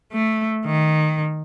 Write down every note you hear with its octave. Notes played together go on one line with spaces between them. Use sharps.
A3
D#3